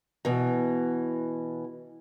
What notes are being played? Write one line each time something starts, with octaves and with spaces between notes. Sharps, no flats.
B2 E3